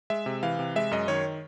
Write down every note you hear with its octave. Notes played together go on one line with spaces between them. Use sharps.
G#3 E5
C3
E3 F5
C3
G#3 E5
F#2 D#5
D#3 C#5